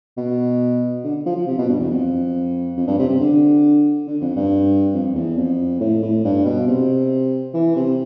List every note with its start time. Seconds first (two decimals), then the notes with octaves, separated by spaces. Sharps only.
0.17 B2
1.04 D3
1.26 F3
1.36 F3
1.47 C3
1.58 B2
1.69 G2
1.79 E2
1.91 F2
2.77 F2
2.88 G2
2.99 C3
3.09 C3
3.20 D3
4.07 D3
4.21 F2
4.36 G2
4.94 F2
5.15 E2
5.37 F2
5.80 A2
6.02 A2
6.24 G2
6.45 B2
6.68 C3
7.54 E3
7.76 C3